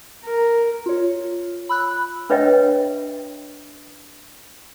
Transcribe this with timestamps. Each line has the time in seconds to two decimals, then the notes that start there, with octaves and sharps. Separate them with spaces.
0.24 A#4
0.86 F4 C#5
1.69 B5 E6 F#6
2.30 D4 B4 C#5 D#5 E5 G5